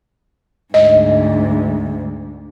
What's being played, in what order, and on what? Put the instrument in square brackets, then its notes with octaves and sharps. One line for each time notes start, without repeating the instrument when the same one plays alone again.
[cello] D2 G#2 [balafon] D#5